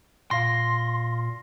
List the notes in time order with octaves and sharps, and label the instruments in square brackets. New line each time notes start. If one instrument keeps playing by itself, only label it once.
[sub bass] A#2 [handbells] F5 A#6 [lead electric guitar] C6